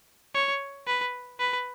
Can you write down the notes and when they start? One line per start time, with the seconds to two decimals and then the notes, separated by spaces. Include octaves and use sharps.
0.35 C#5
0.87 B4
1.39 B4